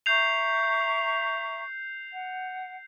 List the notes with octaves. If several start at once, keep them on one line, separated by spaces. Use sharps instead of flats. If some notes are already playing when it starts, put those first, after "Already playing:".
E5 A#5 C#6 G6 C7 F7
F#5